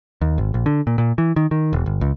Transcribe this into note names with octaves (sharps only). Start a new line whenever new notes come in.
D#2
G#1
A#1
D3
A#2
A#2
E3
D#3
D#3
E1
G1
C#2